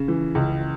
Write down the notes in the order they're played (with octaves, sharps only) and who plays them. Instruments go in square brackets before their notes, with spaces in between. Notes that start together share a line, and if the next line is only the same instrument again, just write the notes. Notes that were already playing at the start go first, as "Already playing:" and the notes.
Already playing: [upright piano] C#3
E3
C#2